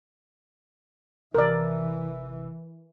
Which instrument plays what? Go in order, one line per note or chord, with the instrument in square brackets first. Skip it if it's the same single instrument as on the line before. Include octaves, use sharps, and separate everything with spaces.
[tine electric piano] G#1 C3 E6 [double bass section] E3 [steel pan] A#4 D5